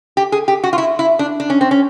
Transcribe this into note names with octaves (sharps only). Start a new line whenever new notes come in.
G4
G#4
G4
F#4
F4
E4
E4
D4
D4
C#4
C4
C#4